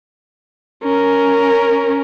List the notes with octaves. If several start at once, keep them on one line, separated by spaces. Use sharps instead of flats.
C#4 A#4